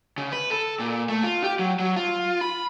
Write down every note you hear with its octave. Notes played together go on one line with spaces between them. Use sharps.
C#3
B4
A4
A#2
A3
F4
G4
F#3
F#3
F4
B5